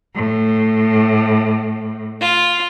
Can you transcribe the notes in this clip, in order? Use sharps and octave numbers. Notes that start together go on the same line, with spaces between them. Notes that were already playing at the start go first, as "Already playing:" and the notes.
A2
F4